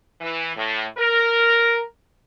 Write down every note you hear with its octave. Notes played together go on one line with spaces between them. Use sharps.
E3
A2
A#4